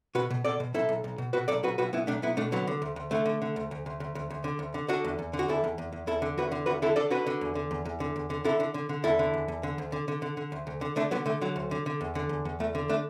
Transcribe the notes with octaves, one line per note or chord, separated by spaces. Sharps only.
B2 F#4 B4
B2
B2 A4 D5
B2
B1 E4 A4
B1
B1
B2
B2 F#4 B4
B1 A4 D5
B1 F#4 B4
B1 F#4 B4
B1 B3 E4
B1 A3 D4
B1 B3 E4
B2 A3 D4
D3 F#3 B3
D3
D2
D2
D3 A3
D3
D3
D2
D2
D2
D2
D2
D2
D3
D2
D3
D3 D4 F#4
E2
E2
D3
F#4
E2 E4 A4
E2
E2
E2
E2 E4 A4
D3
E2 F#4 B4
D3
E2 F#4 B4
D3 E4 A4
D3 A4 D5
D3 F#4 B4
D3
E2
D3
E2
E2
D3
E2
D3
D3 E4 A4
D3
D3
D3
E2 E4 A4
D3
E2
E2
D3
D2
D3
D3
D3
D3
D2
D2
D3
D3 A3 D4
D3 F#3 B3
D3 A3
D3 F#3
D2
D3
D3
E2
D3
E2
E2
E2 A3
D3
A3 D4